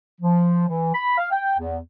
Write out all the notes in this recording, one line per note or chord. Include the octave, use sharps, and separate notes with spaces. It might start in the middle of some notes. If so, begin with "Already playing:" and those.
F3
E3
B5
F5
G5
E2